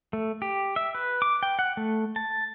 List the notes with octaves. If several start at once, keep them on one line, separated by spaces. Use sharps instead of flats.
A3
G4
E5
B4
D6
G5
F#5
A3
A5